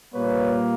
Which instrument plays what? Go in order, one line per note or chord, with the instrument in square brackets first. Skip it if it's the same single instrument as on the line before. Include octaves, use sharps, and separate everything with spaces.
[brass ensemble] A#2 G3 A#3 B4 C#5